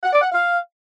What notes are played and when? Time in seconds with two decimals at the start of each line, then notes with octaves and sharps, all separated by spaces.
0.03 F#5
0.12 D5
0.22 F#5
0.31 F5